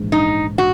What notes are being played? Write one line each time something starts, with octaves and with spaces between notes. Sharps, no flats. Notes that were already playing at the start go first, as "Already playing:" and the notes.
Already playing: A#1 G#2 E3 G#3
D#4
F#4